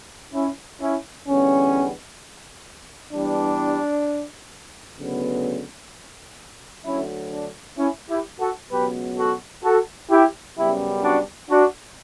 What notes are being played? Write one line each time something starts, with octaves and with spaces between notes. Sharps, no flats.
C#4 E4
C#4 E4
E2 D3 G3 B3 C#4
G2 E3 G3 B3 D4
D2 C#3 F#3 B3
D2 D3 F#3 C#4 E4
D4
C#4 E4
E4 G4
F#4 A4
C#2 B2 F#3 B3 G4 B4
F#4 A4
F#4 A4
E4 G4
F#2 C#3 G3 B3 E4 G4
D4 F#4
D4 F#4